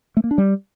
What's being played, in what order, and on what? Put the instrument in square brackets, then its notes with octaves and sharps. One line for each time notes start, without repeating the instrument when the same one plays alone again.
[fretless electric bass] A3
A#3
D4
G3